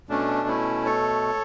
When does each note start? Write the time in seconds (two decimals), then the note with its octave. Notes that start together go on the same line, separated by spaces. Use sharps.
0.09 B2 A3 C#4 D4
0.48 C#4 E4
0.85 A4 C#5